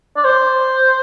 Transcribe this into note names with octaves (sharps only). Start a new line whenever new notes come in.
D5
C5